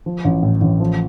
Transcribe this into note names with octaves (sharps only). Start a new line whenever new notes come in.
F3
A1
A2
A1
F3